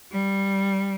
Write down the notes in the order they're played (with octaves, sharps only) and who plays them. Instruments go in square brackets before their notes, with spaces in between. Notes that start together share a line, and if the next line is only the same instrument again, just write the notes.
[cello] G3